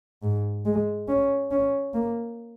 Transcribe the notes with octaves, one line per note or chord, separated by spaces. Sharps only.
G#2
G#3
C#4
C#4
A#3